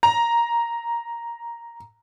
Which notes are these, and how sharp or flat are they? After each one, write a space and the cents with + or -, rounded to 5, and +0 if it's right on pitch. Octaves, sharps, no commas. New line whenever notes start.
A#5 +5